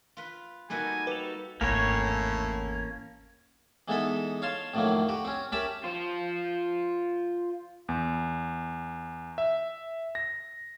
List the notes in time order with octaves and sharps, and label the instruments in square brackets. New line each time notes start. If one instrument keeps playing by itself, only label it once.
[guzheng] F4 B4
[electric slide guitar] G3 D#4 F#4 [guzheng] A#3 A4 B4 [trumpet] G#5
[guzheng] G4 [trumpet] A4 [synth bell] B4 F7
[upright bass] G#1 E2 [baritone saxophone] A2 [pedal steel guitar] A#3 C#4 C#5
[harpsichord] E3 G#3 B3 D#4 A4 E5
C#5 F5 A5 C6
F2 A2 D#3 F#3 A#3
F#4 G4
C4 C#4
C#4 G4 A#4 E5 A5 B5
[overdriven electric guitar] F4 C5
[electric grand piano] E2
E5
A#6